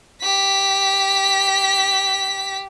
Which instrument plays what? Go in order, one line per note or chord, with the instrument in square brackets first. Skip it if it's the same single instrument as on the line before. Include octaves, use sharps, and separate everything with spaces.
[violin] G4 B6